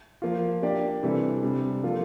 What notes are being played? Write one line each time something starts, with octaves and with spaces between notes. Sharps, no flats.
F3 A#3 F4
A#3 D4 G4 D5
C3 E3 G3 D4 A4
C3 G3 D4
F3 A#3 F4 A4